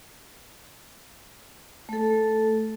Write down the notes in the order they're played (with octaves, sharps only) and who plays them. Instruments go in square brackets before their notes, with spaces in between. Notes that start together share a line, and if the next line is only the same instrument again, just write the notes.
[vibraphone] A3 A4